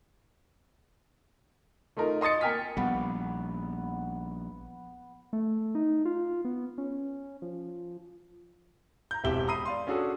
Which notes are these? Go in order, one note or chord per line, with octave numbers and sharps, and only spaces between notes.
A3 D#4 F4 A#4
D#5 C6 D#6 A6 C#7
A#3 A#4 G5 G#5 F6 B6
A#1 G3 B3
A3
D#4
F4
B3
C#4
F3
A#5 G6
E1 C3 E4 G4 E5 G7
A#5 B5 D#6 C7 D#7
D5 F5 C6
C#4 D4 F#4 G#4 A4